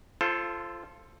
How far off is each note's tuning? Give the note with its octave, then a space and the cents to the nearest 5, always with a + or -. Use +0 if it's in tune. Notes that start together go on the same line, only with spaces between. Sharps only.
F4 -20 A4 +0 C5 +15